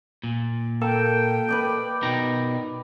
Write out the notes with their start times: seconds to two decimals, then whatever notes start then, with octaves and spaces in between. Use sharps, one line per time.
0.23 A#2
0.81 A#3 A4 A#4 G5 A5
1.49 B4 D5 D#5
2.03 B2 D#4 A#4 G5 A#6